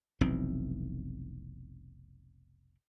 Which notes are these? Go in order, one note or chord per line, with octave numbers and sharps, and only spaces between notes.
F1 B1 E3 C4